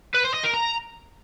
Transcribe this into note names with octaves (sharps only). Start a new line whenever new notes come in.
B4
C5
D#5
A#4
A#5